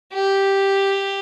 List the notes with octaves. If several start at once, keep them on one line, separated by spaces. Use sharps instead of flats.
G4